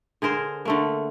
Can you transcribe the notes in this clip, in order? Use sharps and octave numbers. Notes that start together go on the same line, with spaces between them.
D3 G#4 A#4 C5
D3 A3 A#3